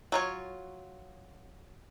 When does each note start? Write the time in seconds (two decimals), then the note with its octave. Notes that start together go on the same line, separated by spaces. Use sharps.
0.12 F#3 F4 C#5